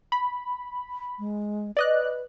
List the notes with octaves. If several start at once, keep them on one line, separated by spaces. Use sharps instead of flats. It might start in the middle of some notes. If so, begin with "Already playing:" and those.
B5
G#3
B4 D5 D#5 F#6